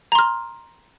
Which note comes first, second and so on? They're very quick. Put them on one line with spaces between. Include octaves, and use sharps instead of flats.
A#5 C6 F6